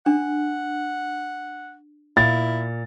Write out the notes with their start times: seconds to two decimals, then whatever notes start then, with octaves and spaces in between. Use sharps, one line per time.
0.06 D4 F#5
2.17 A#2 E4 A6